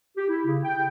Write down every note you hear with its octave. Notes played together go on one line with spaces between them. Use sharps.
G4
E4
C#3
G5